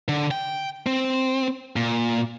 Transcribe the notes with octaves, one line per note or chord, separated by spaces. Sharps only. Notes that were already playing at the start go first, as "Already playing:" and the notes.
D3
G5
C4
A#2